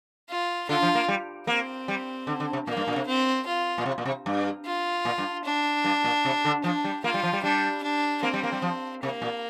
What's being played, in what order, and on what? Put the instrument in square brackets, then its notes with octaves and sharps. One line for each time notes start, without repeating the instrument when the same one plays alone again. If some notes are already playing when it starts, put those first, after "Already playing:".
[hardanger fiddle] F4
[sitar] D3 [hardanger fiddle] F4
[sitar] F3
A#3
G3
[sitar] A#3 [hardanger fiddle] C4
[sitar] G3
D3
D3
C3
[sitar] A#2 [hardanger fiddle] A#3
[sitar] G2
A#2
C3
[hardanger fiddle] C4
F4
[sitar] A#2
C3
A#2
C3
G2
[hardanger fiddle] F4
[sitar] A#2
G2
[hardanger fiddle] D4
[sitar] G2
A#2
C3
D3
[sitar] F3 [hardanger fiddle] D4
[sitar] G3
[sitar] A#3 [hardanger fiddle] F4
[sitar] G3
F3
G3
[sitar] G3 [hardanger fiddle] D4
[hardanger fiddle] D4
[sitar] A#3 [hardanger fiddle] C4
[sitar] G3
A#3
G3
F3
[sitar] C3 [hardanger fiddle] A#3
[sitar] A#2